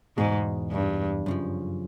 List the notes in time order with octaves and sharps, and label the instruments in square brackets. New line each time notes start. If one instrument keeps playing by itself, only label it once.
[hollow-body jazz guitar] E2 B2 G#3 [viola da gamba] G#2
[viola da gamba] G2
[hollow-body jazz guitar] F#2 C#3 F3